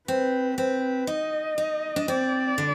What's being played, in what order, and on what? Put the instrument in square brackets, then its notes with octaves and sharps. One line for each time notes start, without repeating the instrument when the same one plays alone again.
[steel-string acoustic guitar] C4 [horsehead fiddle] B4
[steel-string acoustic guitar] C4 [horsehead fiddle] B4
[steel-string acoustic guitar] D#4 [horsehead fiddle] D#5
[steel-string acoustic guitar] D#4
D4
[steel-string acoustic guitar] C4 [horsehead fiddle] D5
[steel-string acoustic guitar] D3